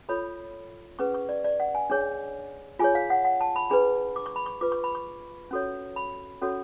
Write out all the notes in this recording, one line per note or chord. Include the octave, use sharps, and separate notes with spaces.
F4 A4 C#5 B5
C#4 G#4 B4 C#6
C#6
D5
D5
F#5
G#5
D4 G#4 C#5
F4 G#4 C#5 G#5
F5
F#5
F#5
A5
B5
D4 G#4 B4 B5
D6
C#6
B5
C#6
F4 B4 D6
C#6
B5
C#6
C#4 F#4 A4 C#5
B5
C#4 F#4 A4 C#5